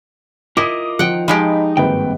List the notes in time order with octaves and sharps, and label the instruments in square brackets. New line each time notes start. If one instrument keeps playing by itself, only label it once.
[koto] E4 [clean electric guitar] F4 A#4 D#5 [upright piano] D6 D#6 D#7
[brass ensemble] D#3 [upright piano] F3 [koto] F#5 G5
[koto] F3 G#3 G4 [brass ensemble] D#4 [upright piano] B5
[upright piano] G#1 A#3 B4 [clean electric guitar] G2 C4 G5